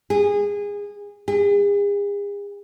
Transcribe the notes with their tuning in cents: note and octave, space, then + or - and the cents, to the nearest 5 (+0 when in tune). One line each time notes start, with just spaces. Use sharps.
G#4 -25
G#4 -45